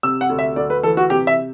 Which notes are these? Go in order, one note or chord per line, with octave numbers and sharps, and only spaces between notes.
C3 E6
F#5
D2
E5
D2 D5
B4
E3 A4
F#4
C3 G4
E5